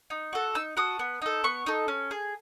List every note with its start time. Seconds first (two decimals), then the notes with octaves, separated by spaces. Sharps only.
0.10 D#4
0.33 F#4 A4
0.55 D#4 E6
0.77 F#4 A4 D#6
0.99 B3
1.22 D#4 A4
1.44 B3 C#6
1.66 D#4 A4
1.88 C#4
2.11 G#4